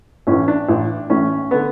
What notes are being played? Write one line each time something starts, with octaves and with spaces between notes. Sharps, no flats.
A1 A2 E3 C#4
D4
A1 A2 E3
A1 A2 E3 C#4
D3 B3